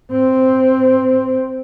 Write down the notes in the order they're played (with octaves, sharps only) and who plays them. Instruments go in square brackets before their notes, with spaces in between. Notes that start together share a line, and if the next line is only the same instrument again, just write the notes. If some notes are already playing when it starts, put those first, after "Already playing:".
[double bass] C4